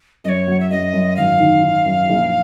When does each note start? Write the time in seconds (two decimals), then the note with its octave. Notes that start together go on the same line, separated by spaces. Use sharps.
0.24 F#2 D#5
0.29 C#5
0.47 F#3
0.60 E5
0.70 F#2 D#5
0.93 F#2
1.16 G#1 F5
1.40 D#3
1.63 D#3
1.85 F#2
2.09 A#1